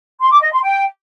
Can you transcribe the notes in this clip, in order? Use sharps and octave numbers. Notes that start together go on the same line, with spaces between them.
C6
D6
D#5
C6
G5